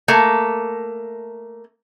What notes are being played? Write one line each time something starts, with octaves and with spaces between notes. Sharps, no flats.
A3 A#3